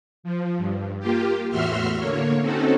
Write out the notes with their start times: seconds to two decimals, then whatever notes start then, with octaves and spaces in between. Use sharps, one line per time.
0.24 F3
0.58 G2
0.99 A#3 F4 G4
1.50 E2 A2 F#4 E5 C6 F6
1.99 D3 A#3 C#5
2.41 C4 C#4 D#4 F#4 A4